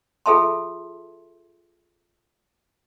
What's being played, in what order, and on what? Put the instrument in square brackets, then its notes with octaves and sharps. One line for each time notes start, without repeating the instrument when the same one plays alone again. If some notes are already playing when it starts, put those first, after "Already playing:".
[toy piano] F4 G#4 A4 E5 A5 C6